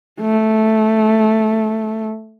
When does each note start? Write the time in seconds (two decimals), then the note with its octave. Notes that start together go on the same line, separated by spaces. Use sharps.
0.21 A3